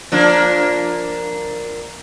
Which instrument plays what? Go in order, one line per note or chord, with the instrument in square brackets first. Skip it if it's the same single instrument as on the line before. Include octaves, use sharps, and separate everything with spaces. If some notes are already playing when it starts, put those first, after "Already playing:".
[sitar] F3 A#3 D4